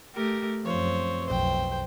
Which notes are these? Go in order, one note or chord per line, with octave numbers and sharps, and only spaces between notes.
A3 G4 A#4
F#2 F3 C4 C5 C#5
B1 F2 C5 G5